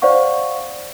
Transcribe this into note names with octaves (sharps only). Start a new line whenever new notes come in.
C5 D5 F5 F#5 C#6